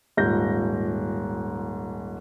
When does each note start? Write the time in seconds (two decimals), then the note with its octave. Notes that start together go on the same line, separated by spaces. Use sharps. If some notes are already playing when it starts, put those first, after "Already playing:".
0.17 D#1 G#2 F4 G6 A#6